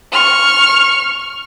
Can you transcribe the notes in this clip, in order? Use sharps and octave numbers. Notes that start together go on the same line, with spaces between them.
C#6 F6